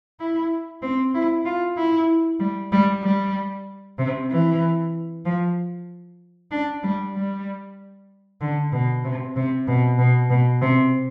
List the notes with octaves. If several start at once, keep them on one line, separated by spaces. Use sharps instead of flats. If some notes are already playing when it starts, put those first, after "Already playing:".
E4
C4
E4
F4
E4
G3
G3
G3
C3
E3
F3
D4
G3
G3
D3
B2
C3
C3
B2
B2
B2
C3